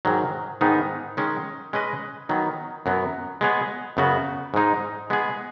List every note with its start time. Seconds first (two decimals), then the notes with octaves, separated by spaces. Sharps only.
0.05 G#2 D#3 F#3
0.61 G#2 D#3 B3 D#4
1.17 D#3 G#3 C#4
1.73 G#3 C#4 B4 D#5
2.29 D#3 F#3 B3
2.86 F#2 F#3 B3
3.41 G#3 B3 G#4 C#5
3.97 F#2 C#3 B3 F#4
4.54 G#2 G#3 D#4
5.10 G#3 B3 G#4